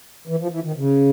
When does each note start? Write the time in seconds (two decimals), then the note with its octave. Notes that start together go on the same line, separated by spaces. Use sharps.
0.28 E3
0.39 F3
0.51 E3
0.64 D#3
0.76 C#3